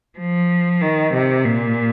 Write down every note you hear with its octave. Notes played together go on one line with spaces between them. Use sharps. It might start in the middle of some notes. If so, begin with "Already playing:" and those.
F3
D#3
C3
A#2